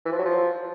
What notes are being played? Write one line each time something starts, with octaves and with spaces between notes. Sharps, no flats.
E3
F3
F#3
F3